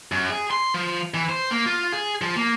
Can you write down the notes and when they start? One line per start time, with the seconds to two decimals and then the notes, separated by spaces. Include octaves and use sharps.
0.12 F#2
0.30 G#4
0.51 C6
0.74 F3
1.14 E3
1.29 C5
1.51 A#3
1.66 F4
1.92 G#4
2.22 F3
2.36 A#3